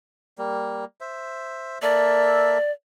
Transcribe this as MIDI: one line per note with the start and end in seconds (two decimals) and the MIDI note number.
0.38 0.85 55
0.38 0.85 58
1.01 1.78 72
1.01 1.78 76
1.82 2.58 58
1.82 2.58 69
1.82 2.71 74
1.82 2.58 76